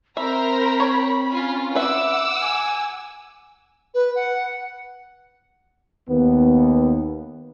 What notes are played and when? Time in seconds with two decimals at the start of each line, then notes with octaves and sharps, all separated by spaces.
0.17 C4 A#4 C5 E5 A#5 B5
0.80 C#5
1.30 C#4 F4
1.75 B4 E5 F#5 D6 E6
2.41 G#5
3.94 B4
4.15 F#5
6.09 D#2 B3